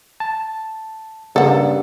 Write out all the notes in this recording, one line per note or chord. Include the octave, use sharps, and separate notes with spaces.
A5
G2 C#3 A#3 A4 F#5